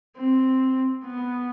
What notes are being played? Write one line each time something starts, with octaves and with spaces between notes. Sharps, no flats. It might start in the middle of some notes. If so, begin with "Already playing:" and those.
C4
B3